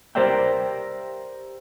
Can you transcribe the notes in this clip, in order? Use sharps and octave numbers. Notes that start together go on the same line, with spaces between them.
G4 A#4 C5 D5 E5 G5